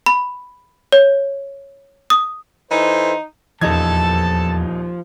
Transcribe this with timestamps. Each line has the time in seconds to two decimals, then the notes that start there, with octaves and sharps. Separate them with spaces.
0.06 B5
0.92 C#5
2.10 D#6
2.71 E3 D#4 A4 C5
3.61 D#1 E2 E3 F3 D#4 A4 A5 G#6